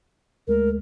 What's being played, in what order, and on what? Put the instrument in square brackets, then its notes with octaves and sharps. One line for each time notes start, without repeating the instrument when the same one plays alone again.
[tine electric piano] D2 G#3 A3 [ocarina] A#4